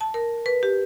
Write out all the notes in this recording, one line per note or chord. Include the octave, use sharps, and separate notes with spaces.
A5
A#4
B4
G4